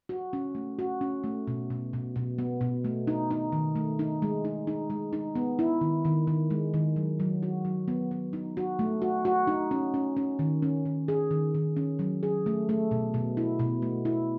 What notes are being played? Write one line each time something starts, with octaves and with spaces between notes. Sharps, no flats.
F#4
C#4
A3
F#4
C#4
A3
B2
B2
B2
B2
B3
B2
A3
D#4
D#4
D#3
A3
D#4
G#3
D#4
D#4
G#3
D#4
B3
E4
D#3
D#3
D#3
G#3
D#3
F#3
F#3
F#4
F#3
B3
B3
D#4
F#4
A3
F#4
F#4
D#4
C#4
C#4
C#4
D#3
C#4
D#3
G#4
D#3
D#3
C#4
F#3
G#4
A3
A3
B2
B2
E4
B2
A3
E4